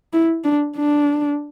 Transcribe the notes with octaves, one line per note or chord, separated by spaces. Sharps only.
E4
D4
D4